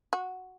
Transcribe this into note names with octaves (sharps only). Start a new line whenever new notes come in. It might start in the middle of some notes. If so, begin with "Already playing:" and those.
F#4